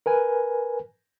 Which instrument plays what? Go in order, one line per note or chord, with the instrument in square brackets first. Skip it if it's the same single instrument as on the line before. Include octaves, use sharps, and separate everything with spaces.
[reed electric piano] A#4 B4 G#5